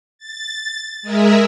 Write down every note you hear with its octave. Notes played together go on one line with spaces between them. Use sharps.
A6
G#3 G#4 A#4 E5